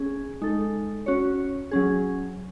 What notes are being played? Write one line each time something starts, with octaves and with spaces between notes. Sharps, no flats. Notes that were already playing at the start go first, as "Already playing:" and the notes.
Already playing: C#4 G#4
G#3 D#4 A4
C#4 F#4 C#5
F#3 C#4 G#4